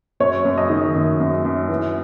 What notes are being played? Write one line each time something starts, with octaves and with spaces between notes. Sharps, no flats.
F#2 C#5
F#2
D#5
D#3
F#2
F#2
F#2
E3